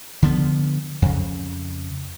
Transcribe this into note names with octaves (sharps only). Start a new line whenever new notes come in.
D3 F3 B3
F2 C#3